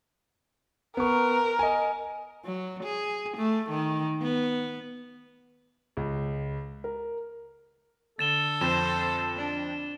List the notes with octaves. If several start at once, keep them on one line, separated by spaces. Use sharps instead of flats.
B3 A#4 C#6
D#5 G#5
F#3
G#4
A3
D#3
B3
C#2
A#4
D3 A4 A6 E7 G7
F2 C4 C5 E7
D4